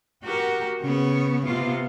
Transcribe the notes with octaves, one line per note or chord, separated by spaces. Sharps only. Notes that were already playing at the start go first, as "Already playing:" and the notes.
F#4 G4 A#4
C#3 B3 C#5
C3 B3 F4